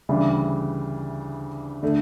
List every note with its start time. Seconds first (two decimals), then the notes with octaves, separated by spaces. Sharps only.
0.09 D2 C#3 E3 G3 D4
1.83 D3 A3